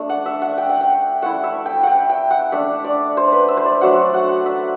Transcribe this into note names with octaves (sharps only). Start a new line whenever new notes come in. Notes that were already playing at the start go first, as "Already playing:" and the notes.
Already playing: A3 D4
F#5
E5
F#5
G5
F#5
G5
A3 E4 F#5
E5
G5
F#5 G5
G5
F#5
A3 D4 E5
D5
C5
B4
E5
C5
D5
F#3 A3 D4 F#5
F#5
E5